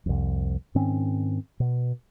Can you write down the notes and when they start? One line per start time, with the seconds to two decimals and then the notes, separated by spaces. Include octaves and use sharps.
0.06 C2 F2
0.75 G#2 D#3 C4 C#4
1.60 B2